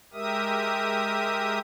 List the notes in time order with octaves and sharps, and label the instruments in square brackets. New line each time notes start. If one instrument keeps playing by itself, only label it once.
[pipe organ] G#3 G4 A#4 E5 D#6